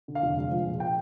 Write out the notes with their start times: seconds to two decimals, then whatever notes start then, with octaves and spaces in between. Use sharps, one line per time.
0.08 D3
0.15 F5
0.22 F1
0.37 G#3
0.51 F3
0.66 A#1
0.80 G5